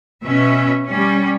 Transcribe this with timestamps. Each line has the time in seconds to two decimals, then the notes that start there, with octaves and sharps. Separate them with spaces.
0.25 B2 C#4 E5
0.87 G3 C#4